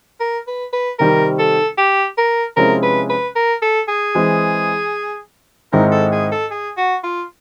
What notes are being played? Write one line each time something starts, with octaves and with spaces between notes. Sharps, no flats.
A#4
B4
B4
C3 D#3 G3 C4 A#4
A4
G4
A#4
C3 F3 G#3 C#4 E4 A#4
B4
B4
A#4
A4
G#4
E3 G#3 C4
G#2 D#3 G#3 C4 E4 A#4
A4
G#4
A4
G#4
F#4
F4